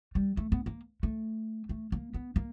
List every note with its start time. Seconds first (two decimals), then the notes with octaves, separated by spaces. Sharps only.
0.15 G3
0.37 A3
0.52 B3
0.66 A#3
1.03 A3
1.69 A3
1.92 A#3
2.14 B3
2.36 A#3